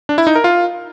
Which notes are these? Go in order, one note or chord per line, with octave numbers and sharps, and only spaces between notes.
D4
E4
D#4
A#4
F4